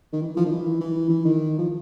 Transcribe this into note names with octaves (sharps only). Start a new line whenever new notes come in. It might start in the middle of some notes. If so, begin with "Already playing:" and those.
D#3
E3
F3
D#3
E3
E3
E3
D#3
F3